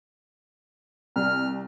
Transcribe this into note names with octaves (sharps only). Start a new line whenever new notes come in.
C2 F6